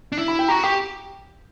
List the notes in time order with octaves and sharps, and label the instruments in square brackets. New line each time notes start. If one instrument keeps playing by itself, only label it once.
[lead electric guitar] D4
E4
[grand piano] B5
G5
[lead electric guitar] F#4 [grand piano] A#5
[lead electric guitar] G4 [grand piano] G5